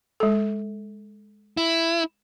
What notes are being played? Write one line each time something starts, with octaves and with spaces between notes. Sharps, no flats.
G#3 A4
E4